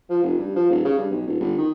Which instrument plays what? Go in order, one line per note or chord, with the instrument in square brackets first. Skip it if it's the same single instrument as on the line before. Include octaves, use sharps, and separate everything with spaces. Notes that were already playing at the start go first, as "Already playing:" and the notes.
[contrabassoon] F3
F1
G2
F3
D#1
C#3
G2
B1
D#1
G1
D#3